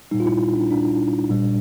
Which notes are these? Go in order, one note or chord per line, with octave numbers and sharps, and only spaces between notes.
A#2 G3 D#4
F4
E4
D4
D4
A#2 G3